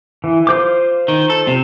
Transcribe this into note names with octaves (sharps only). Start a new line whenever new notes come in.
E3
F4 C5 D6
D#3
A4
C3